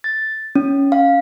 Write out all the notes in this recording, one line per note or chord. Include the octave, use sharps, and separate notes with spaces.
A6
C#4
F5